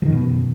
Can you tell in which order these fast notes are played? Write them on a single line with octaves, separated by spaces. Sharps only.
F3 D#3 F#2 B2